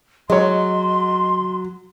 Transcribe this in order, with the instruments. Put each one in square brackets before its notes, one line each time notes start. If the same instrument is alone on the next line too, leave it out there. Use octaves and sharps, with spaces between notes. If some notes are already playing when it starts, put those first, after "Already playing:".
[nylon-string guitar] F#3 [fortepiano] G#3 C#5 [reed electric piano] D#5 [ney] C6